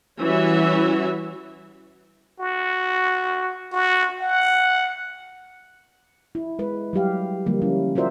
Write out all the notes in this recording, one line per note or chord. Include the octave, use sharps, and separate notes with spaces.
E3 G3 C#4 F#4 C#5 E5
F#4
F#4
F#5
E4
G#3 B4
F#3 G3 G4 F5
D3 F3 G3 A#3
G3 C#4 E4
F4 F#4 A#4 C5 D5 E5